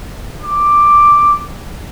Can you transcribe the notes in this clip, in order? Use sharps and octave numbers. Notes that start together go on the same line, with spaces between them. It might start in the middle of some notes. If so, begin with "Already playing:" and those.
D6